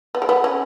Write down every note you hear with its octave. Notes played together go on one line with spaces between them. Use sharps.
B3
G#3
B3
C#4